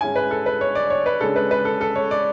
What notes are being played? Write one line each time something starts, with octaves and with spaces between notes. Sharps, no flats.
G#2 G#3 C#4 E4 G#5
B4
A4
B4
C#5
D5
C#5
B4
C#3 G#3 D4 A4
B4
B4
A4
A4
C#5
D5